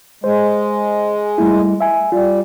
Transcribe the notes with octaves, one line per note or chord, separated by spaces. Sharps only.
G#3 C5
G3 A3 E4
E5 G#5
G3 F4